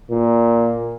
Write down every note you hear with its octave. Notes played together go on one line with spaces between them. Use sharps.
A#2